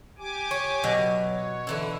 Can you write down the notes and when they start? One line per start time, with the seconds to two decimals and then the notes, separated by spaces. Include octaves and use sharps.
0.18 G4 G#5 D6
0.51 C#5
0.84 B2 F#3
1.25 C#5
1.67 D3 E3 E4